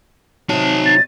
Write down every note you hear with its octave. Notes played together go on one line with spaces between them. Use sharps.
C3 D#3 F#3 D#4 A5
A6